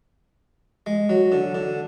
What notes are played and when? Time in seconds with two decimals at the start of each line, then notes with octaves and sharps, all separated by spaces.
0.86 G#3
1.09 F#3
1.32 D3
1.55 D3